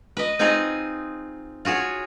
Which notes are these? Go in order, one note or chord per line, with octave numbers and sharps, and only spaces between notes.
B4 D#5
C4 D#4 F4 G#4 D#5 F5
F4 F#4 G#4 C#5